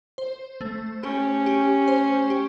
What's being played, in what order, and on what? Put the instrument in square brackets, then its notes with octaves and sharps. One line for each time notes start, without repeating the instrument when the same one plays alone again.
[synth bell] C5
A3
[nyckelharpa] C#4 [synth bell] G4
[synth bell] G4
C5
G4